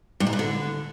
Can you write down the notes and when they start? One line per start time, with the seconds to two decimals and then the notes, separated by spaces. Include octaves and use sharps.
0.20 G2
0.27 G#2
0.33 G2
0.39 D3